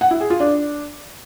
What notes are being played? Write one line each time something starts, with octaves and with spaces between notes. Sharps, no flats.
F#5
E4
G#4
F4
D4